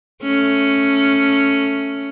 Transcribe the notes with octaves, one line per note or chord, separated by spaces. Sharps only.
A3 C#4